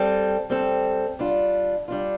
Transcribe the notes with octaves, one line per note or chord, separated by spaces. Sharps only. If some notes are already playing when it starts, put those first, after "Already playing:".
Already playing: G3 C4 A4
G3 C4 A4
G3 D4 F4
G3 D4 F4